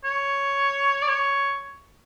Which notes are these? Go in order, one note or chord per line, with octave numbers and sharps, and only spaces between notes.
C#5
D5
C#5